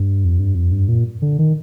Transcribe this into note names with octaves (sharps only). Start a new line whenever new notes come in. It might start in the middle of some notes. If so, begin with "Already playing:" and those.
Already playing: G2
F2
G2
F2
G2
A#2
D3
D#3